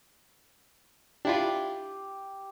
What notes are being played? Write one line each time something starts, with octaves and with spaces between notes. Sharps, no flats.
D4 E4 F4 G4